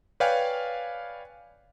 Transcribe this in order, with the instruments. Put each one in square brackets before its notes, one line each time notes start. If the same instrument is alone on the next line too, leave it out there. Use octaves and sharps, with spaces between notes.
[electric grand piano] B4 C#5 D5 F5 G5 G#5